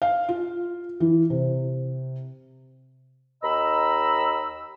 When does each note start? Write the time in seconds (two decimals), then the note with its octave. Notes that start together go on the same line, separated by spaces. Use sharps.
0.02 F5
0.29 F4
1.00 E3
1.30 C3
3.43 D#2 D#5 A#5 B5 E6